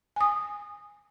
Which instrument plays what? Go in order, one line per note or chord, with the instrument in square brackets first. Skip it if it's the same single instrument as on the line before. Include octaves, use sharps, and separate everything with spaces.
[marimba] G#5 D#6